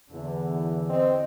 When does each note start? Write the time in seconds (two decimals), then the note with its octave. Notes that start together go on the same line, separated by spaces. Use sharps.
0.11 E2 D3
0.89 C4 D#5